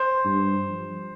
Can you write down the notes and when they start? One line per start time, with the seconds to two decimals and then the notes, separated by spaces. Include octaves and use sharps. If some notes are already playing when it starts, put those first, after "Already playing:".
Already playing: C5
0.25 G2
0.69 F3